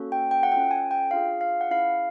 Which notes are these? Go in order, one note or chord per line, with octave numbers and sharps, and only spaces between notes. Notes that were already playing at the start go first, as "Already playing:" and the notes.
Already playing: A#3 C#4 F#4 A4
G5
G5
F#5
C#4 F4 A4 G5
G#5
G5
D4 F4 G#4 F5
F5
F#5
C#4 E4 G#4 F5